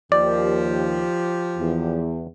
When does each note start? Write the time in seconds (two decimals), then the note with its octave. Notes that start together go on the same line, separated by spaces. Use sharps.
0.12 D#2 F3 G4 D5
1.58 E2